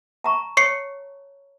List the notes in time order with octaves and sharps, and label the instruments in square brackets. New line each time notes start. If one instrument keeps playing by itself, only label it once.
[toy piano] A5 A#5 C#6
[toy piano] C#5 [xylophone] C#6 C7 C#7